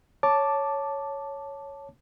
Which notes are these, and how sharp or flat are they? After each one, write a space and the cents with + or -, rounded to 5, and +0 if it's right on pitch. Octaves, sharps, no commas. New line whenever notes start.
C#5 +0 A5 +0 D6 +0